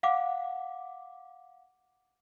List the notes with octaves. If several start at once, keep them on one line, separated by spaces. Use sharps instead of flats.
F5 F#5 D6